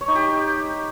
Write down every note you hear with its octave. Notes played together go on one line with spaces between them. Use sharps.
C#5
D#4
G4